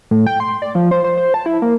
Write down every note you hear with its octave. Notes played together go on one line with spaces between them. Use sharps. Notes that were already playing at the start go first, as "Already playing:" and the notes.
A2
G5
C6
D5
F3
C5
C5
C5
A5
E4
A#3